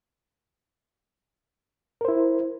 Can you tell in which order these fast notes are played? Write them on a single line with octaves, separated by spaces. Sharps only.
A#4 C5 E4